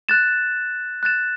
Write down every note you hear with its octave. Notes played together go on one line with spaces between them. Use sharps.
F#6 A6 E7
F#6 A6 E7